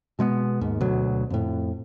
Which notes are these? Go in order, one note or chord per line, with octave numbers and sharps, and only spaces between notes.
B2 G#3 A3 B3
D#2 G#2
D2 B2 F#3
F2 A2